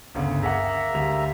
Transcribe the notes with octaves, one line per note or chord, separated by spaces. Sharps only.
G1 D2 C#3
A#3 G#4 E5 F#5 A#5
D2 G3 F7